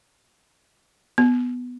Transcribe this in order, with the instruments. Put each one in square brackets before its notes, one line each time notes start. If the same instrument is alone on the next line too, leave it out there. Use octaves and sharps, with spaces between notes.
[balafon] B3